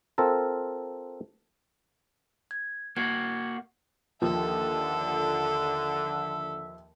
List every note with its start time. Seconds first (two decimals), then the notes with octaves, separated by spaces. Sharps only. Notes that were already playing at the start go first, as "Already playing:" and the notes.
0.18 C4 F4 A4 A#4
2.51 G#6
2.97 A#3 F#4 G#6
4.22 D#2 D3 F3 A4 E5